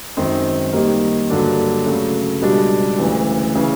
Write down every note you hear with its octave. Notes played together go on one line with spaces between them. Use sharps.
F#2 D#3 G#3 C4
D#3 G3 A#3
G2 D3 F#3 A#3 D4
C#3 F#3 A3
C#2 B2 G3 B3 D4
D2 C#3 E3
C#3 E3